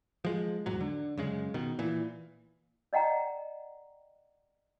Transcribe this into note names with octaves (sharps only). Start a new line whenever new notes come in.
F3 G#3
E1 G#2 F#3
D3
F#2 C#3 G#3
B2 D#3
A#2 E3
D5 D#5 F#5 G5 A#5